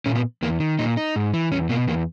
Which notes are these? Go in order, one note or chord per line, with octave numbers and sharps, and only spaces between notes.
A#2 C#4
B3
E2 A#3
D#3
A#2 D#4
D#4
G#2
E3
E2 C#4
B2 A#3
E2 A#3